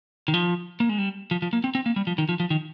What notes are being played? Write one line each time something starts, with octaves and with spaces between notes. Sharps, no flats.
D#3
F3
A#3
G#3
G3
F3
F3
A#3
C4
C4
A#3
G3
F3
D#3
F3
F3
D#3